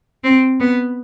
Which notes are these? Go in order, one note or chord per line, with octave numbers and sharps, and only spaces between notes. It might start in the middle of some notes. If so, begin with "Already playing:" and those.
C4
B3